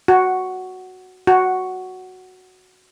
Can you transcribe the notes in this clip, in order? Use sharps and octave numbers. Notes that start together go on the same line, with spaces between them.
F#4
F#4